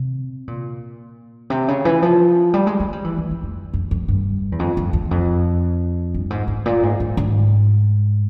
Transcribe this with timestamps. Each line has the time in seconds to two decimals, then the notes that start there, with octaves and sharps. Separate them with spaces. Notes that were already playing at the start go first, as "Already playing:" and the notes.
Already playing: C3
0.48 A#2
1.50 C3
1.68 C#3
1.85 E3
2.02 F3
2.54 G3
2.67 G#3
2.80 G#3
2.93 G3
3.04 E3
3.18 F2
3.31 F2
3.43 F2
3.73 F2
3.91 F2
4.08 G2
4.52 E2
4.59 F2
4.77 F2
4.93 E2
5.11 F2
6.14 G2
6.30 G#2
6.48 G#2
6.66 A#2
6.83 G#2
7.00 G#2
7.17 G#2